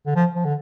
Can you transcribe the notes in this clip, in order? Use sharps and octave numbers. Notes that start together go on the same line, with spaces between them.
D3
F3
F3
D3